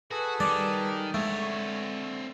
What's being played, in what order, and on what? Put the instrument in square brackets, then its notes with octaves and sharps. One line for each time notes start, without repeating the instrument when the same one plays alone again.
[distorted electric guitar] F#4 [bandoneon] G#4 A4 B4
[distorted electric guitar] D#3 [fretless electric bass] G3 [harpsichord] D5
[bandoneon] D3 [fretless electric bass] G#3 [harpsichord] A3 [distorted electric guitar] C4 C#5